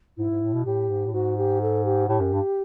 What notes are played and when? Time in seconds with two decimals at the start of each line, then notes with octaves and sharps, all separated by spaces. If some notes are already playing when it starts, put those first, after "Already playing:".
0.18 G#2 E4
0.30 G#2
0.42 A2
0.53 B2
0.65 A2 G4
0.89 G#2
1.06 A2
1.13 G#2 F#4
1.37 G4
1.62 A4
1.85 G4
2.08 A2 G4
2.20 F#2
2.33 G2